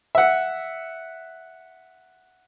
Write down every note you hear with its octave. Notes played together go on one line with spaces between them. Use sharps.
E5 F#5